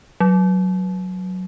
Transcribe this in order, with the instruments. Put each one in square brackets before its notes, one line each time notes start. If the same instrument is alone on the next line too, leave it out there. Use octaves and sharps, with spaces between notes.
[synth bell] F#3